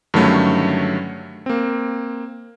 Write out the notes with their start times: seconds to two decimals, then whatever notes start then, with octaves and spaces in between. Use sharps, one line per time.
0.14 G2 D3 D#3 F#3 A3 C#4
1.46 A#3 C4